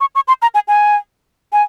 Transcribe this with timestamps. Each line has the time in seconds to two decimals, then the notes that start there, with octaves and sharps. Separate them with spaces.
0.01 C#6
0.15 C#6
0.28 C6
0.42 A#5
0.54 G#5
0.68 G#5
1.53 G#5